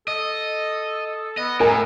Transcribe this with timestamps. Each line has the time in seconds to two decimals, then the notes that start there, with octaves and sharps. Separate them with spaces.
0.08 A4 D#5
1.37 B3 D#5
1.60 A2 A#4 G#5